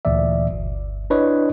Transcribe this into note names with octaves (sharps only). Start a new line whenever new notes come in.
D2 A#2 E3 D5 E5
G1
D4 E4 B4 C#5 D#5